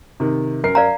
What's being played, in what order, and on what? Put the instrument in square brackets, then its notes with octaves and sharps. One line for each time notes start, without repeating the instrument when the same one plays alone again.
[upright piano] C3 D#3
F#2 A#4 C7
[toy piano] D5 F5 A#5